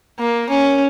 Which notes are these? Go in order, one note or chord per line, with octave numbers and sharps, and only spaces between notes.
A#3
C#4